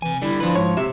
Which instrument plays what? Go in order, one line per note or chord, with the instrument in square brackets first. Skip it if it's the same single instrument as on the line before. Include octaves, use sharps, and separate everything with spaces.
[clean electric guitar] C3 G#5 [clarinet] E3
[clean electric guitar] D3 G3 [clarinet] E4
[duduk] F3 [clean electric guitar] D4 B4
[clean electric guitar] G#2 [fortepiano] C#5
[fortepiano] C3 [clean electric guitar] E5